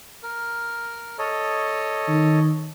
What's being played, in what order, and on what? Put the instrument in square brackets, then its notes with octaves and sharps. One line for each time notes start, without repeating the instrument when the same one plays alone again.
[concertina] A#4
A4 C#5 D#5
[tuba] D#3